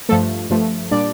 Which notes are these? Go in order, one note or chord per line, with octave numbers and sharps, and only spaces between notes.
G2 F3 A3 A4
G2 F3 A3
A#2 G3 D4 D5